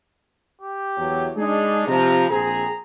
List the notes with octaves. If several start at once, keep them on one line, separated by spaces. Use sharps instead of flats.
G4
E2 F#3
G#3 D4 D#4 G#4
C3 F3 A#5
A#1 C4 G#4 A#5